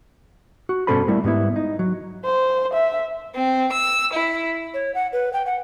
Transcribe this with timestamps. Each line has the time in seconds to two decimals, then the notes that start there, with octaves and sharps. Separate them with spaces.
0.69 F#4
0.87 G2 B2 C#4 A4 C5 B5
1.08 G3 A3 E4 A#4
1.24 G#2 G3 B3 E4
1.56 D#4
1.79 F#3
2.24 C5
2.74 E5
3.35 C4
3.72 E6
4.13 E4
4.74 C#5
4.95 F#5
5.13 B4
5.33 G5
5.46 F#5